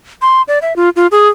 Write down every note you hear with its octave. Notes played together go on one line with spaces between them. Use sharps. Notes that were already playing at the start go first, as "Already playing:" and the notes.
C6
D5
E5
F4
F4
G#4